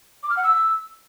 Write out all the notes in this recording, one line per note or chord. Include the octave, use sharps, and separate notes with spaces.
D6
F6
F#5
E6